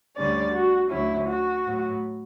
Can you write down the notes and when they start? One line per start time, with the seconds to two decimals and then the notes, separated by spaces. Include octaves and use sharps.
0.16 D2 D3 G3 C#4 D5
0.54 F#4
0.90 D2 D3 F#3 C#4 E4
1.28 F#4
1.65 A2 F#3 B3